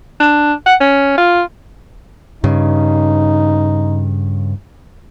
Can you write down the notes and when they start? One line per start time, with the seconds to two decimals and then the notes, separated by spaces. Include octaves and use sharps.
0.20 D4
0.66 F#5
0.80 C#4
1.18 F4
2.44 G2 C#3 D#4